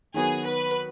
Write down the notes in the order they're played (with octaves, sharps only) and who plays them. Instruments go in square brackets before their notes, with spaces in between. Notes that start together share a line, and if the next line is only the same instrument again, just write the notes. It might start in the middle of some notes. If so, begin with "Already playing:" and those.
[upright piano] D#3 F#3 B3 F#4 [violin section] G#4
[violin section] B4